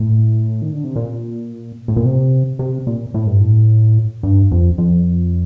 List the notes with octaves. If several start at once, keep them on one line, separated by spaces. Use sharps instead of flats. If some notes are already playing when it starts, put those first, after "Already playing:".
Already playing: A2
D#3
D3
C3
A#2
A2
A#2
C3
C3
A#2
A2
G2
A2
G2
F2
F2